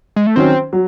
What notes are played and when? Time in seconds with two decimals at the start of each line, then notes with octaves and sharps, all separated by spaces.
0.16 G#3
0.27 A3
0.36 D#3 F#3 C4 C#4
0.73 F#3